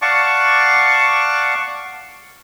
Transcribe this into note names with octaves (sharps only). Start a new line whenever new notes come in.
D5 F5 F#5 A5 C#6 D6